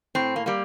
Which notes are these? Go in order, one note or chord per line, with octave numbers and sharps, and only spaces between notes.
A2 C4
A#3
G3 A#3